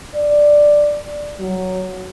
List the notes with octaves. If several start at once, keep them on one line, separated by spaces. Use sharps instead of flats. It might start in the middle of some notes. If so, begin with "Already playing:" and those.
D5
F#3